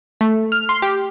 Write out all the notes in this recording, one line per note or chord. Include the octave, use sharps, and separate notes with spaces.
A3
F6
C6
G4